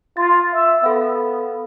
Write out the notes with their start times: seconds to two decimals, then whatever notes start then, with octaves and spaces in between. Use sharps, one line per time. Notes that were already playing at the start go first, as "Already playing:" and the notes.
0.17 F4 A6
0.53 E5
0.84 B3 A4 F5